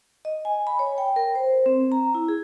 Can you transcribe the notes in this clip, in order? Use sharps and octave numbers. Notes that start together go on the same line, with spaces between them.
D#5
G#5
B5
C#5
G5
A#4
C5
C4
A#5
E4
G#4